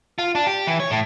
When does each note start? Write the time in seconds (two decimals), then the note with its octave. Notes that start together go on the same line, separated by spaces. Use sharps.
0.19 F4
0.35 D4
0.47 G4
0.67 E3
0.80 C#5
0.91 A2